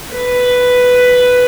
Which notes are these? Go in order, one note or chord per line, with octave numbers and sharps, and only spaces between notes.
B4